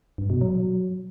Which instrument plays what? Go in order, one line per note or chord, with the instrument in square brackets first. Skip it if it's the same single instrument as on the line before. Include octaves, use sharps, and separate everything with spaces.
[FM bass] G2
B2
F#3